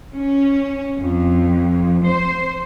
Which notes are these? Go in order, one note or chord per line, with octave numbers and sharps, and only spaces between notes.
C#4
F2
C5